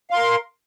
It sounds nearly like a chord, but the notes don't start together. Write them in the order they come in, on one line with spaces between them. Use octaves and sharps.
F5 C6 A#4